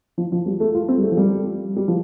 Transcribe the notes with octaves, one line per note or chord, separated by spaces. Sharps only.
F3
F3
G3
A3
F4
C4
G3
A3
F3
G3
G3
F3